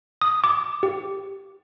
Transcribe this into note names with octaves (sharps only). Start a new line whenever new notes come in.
D#6
D6
G4